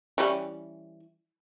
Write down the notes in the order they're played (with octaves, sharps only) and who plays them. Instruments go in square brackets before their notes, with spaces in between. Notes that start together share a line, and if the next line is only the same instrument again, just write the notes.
[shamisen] E3 G3 C#4